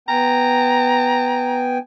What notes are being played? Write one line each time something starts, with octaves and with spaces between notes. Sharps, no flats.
B3 G5 G#5 A#5